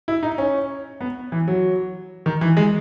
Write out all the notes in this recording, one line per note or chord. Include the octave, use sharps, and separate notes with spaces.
E4
D#4
C#4
B3
E3
F#3
D#3
E3
G#3